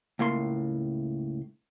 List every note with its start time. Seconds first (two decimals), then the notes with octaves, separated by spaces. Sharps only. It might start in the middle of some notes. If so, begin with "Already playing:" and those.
0.19 C#2 A2 A#3 C6